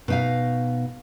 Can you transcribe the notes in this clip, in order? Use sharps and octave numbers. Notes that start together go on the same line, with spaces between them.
B2 D#4 F5